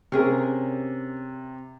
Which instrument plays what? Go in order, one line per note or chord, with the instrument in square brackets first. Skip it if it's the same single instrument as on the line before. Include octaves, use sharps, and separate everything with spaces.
[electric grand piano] C3 [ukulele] C#4 G#4 A#4